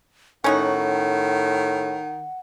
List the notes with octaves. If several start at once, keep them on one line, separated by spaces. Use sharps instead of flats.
A2 D#3 C#4 D#4 F#4 F#5